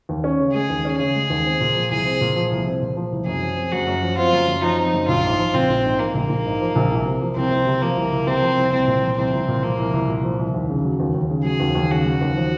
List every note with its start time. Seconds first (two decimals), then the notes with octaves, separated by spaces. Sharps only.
0.09 D#2
0.24 C#4
0.39 C#3
0.54 G#3 G#4
0.70 D#2
0.85 C#4
0.99 C#3 G#4
1.15 G#3
1.30 D#2
1.45 C4
1.61 A#2
1.75 F3
1.91 C2 G#4
2.05 C4
2.21 A#2
2.36 F3
2.52 C2
2.67 C4
2.82 A#2
2.97 F3
3.12 C2
3.27 F#2 G#4
3.42 F3
3.57 C4
3.73 F#2 F#4
3.87 F#2
4.02 F3
4.18 C4 F4
4.33 F#2
4.48 F#2
4.63 F3 D#4
4.79 C4
4.94 F#2
5.08 A#1 F4
5.24 G#2
5.39 F3
5.54 A#1 C4
5.70 A#1
5.84 G#2
5.99 F3 A#3
6.15 A#1
6.29 A#1
6.45 G#2
6.61 F3
6.75 A#1
6.91 C2
7.06 C3
7.21 F3
7.36 C2 C4
7.51 C2
7.66 C3
7.82 F3 A#3
7.97 C2
8.12 C2
8.27 C3 C4
8.42 F3
8.58 C2
8.72 C2 C4
8.88 A#2
9.02 F3
9.18 C2 C4
9.33 C2
9.48 A#2
9.63 F3 A#3
9.78 C2
9.93 C2
10.08 A#2
10.24 F3
10.39 C2
10.54 D#2
10.69 C#3
10.84 F#3
11.00 D#2
11.14 D#2
11.30 C#3
11.45 F#3 G#4
11.60 D#2
11.75 D#2
11.91 C#3 F#4
12.05 F#3
12.21 D#2
12.36 F3